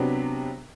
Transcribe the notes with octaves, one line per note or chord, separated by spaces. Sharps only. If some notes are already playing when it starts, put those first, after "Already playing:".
Already playing: C3 F#3 B3 D4 G4